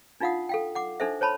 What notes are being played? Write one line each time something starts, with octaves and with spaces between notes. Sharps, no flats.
D4 D#4 F4 F5 F#5 D#6
A4 F5 G5
F#5 D6
D4 D#4 A4 C5 E5
C5 C#5 A5 B5 C6